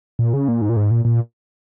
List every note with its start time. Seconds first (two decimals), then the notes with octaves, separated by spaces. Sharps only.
0.19 A#2
0.34 C#3
0.48 A#2
0.62 G#2
0.69 A#2
0.76 G#2
0.91 A#2
1.05 A#2